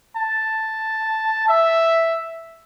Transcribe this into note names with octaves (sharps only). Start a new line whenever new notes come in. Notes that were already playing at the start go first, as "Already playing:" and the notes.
A5
E5